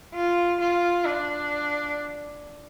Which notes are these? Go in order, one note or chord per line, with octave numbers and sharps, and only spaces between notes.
F4
F4
D4